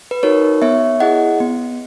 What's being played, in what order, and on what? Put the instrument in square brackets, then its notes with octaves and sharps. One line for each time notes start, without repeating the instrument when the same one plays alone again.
[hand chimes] B4
D#4 F#4 A#4 C#5
B3 C#5 E5
E4 G#4 D#5 F#5
B3